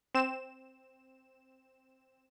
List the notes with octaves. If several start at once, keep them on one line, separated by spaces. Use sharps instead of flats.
C4 E7